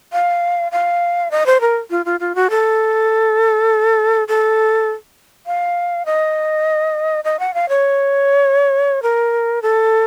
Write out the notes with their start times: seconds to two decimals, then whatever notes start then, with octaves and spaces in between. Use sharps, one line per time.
0.13 F5
0.72 F5
1.31 D#5
1.46 C5
1.61 A#4
1.90 F4
2.05 F4
2.20 F4
2.35 F#4
2.50 A4
4.28 A4
5.46 F5
6.06 D#5
7.24 D#5
7.39 F#5
7.54 F5
7.69 C#5
9.02 A#4
9.62 A4